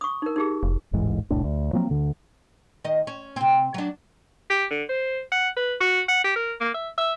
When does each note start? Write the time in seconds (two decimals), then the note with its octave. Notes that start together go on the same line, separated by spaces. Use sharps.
0.01 C#6 D#6
0.22 D#4 A#4
0.36 D#4 G4 G#4
0.63 F1
0.93 D#1 A1 G#2 E3
1.30 E1 C2 A2 D4
1.44 D2
1.73 F3 F#3 A#3 C4
1.90 D2 D3
2.84 D#3 D#5
3.07 C#4
3.36 C3 C4
3.74 F#3 D4
4.50 G4
4.71 D3
4.89 C5
5.32 F#5
5.57 B4
5.81 F#4
6.09 F#5
6.24 G4
6.36 A#4
6.61 A#3
6.74 E5
6.98 E5